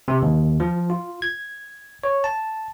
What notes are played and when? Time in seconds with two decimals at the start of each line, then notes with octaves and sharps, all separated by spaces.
0.08 C3
0.22 D#2
0.60 F3
0.90 F4
1.22 G#6
2.04 C#5
2.24 A5